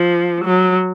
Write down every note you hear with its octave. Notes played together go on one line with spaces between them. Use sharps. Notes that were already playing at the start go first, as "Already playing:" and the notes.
Already playing: F3
F#3